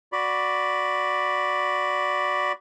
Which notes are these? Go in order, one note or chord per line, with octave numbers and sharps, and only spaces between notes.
F#4 D5 B5